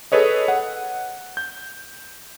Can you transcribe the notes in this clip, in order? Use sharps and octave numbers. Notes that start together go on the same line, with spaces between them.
G#4 A4 B4 C#5 D#5
F#5
G6